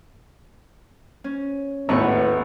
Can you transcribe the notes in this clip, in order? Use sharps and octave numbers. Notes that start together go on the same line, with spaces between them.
C#4
G#1 D#2 A2 B3 B4 C#6